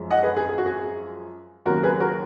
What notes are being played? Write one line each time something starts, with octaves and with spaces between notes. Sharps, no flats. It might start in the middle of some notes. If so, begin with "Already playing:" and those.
Already playing: F#2 F3 G#3
D#5 F#5
G#4 B4
G#4
G#4
F#4
G#4
D#2 C#3 F#3 A#3 F#4 A#4
G#4 B4
F#4 A#4